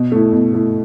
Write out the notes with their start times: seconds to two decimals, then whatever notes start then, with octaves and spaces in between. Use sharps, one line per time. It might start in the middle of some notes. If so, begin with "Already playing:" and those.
Already playing: B2
0.12 A3 E4
0.32 B2
0.54 A3 E4